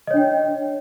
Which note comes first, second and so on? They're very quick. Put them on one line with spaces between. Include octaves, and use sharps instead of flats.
D#5 C#5 D4 G5